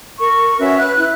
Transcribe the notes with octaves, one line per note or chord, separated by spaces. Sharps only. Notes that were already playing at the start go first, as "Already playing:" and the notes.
A#4 C#6
C#4 F#4 B4 E5
B4 F#6
E4 F#6